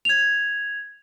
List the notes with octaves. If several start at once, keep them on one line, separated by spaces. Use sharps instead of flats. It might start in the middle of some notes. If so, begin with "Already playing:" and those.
G#6 F7